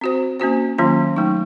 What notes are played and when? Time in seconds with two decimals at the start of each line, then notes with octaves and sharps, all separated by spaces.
0.01 C4 F#4 C5
0.40 A#3 C#4 F#4 C5
0.78 D#3 F#3 A#3 C#4 F4
1.16 F#3 A3 D#4